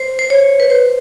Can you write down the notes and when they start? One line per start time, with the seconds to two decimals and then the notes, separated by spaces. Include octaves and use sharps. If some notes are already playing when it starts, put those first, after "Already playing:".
Already playing: C5
0.19 C5
0.30 C#5
0.60 B4
0.70 C5